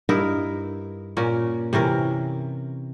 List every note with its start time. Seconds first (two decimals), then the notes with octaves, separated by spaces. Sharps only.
0.09 G2 D#4 E4 A#4
1.17 A#2 C#4 A#4
1.73 C3 E3 C#4 A#4